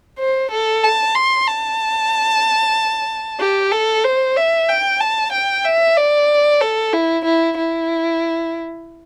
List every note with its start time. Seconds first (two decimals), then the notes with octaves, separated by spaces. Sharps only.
0.19 C5
0.51 A4
0.83 A5
1.15 C6
1.47 A5
3.40 G4
3.72 A4
4.04 C5
4.36 E5
4.69 G5
5.00 A5
5.32 G5
5.64 E5
5.97 D5
6.60 A4
6.93 E4
7.25 E4
7.57 E4